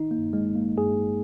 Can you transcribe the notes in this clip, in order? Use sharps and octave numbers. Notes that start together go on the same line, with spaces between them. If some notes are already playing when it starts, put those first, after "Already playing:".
Already playing: D#3 D#4
A#3
G2
G#3
G1
A#3
G2 G#4